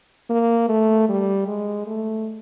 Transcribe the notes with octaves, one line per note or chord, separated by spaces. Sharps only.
A#3
A3
G3
G#3
A3